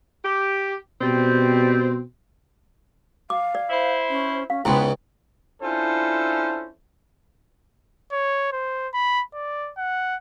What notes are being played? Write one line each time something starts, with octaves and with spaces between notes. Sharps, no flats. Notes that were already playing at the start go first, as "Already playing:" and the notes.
G4
B2 G3 C4
F5 D6
D5
E4 C5
C#4
C#4 F5
C#2 G#2 B3 E4 C#5 G5 C6
C#4 D4 E4 F4 A4 C5
C#5
C5
B5
D5
F#5